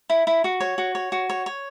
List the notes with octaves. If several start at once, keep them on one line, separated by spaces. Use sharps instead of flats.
E4
E4
F#4
C#5
F#4
C#5
F#4
C#5
C#5